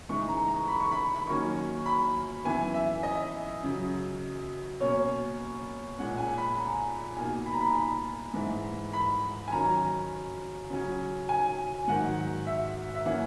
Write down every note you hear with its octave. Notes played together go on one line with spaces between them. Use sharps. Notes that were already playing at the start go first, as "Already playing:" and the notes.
C#3 E3 G#3 D#4 C#6
A#5
A#5
B5
C#6
B5
B5
D#3 F#3 A#3 C#4 C#6
B5
F#2 E3 B3 G#5
E5
D#5
F#2 C#3 F#3
B2 A#3 C#4 C#5
A#2 G#3 C#4 F#5
G#5
B5
A#5
B2 A#3 D#4 G#5
B5
A#5
B5
B5
G#2 E3 G#3
B5
G#5
D#3 F#3 C#4 A#5
C#3 F#3 C#4
G#5
G#2 D#3 F#3 F#5
E5
E5
E3 A#3 C#4 F#5